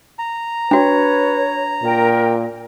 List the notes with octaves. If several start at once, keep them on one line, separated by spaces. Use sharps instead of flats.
A#5
D4 F#4 B4 C#5
A#2 A#4 G5